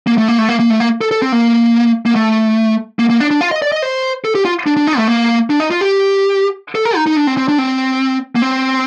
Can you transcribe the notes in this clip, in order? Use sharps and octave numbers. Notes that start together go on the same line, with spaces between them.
A#3
A3
A#3
A3
A#3
A#3
A3
A#3
A4
A4
C4
A#3
A#3
A3
A#3
A#3
D4
D4
F4
D#5
D5
D#5
C5
A4
G4
F4
D4
D4
D#4
A3
A#3
D4
D#4
F4
G4
A4
A#4
D#4
D#4
D4
C4
C4
D4
C4
A#3
C4